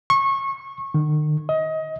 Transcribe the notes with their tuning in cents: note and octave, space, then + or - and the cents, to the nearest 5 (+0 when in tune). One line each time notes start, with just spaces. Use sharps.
C#6 -25
D#3 -45
D#5 +25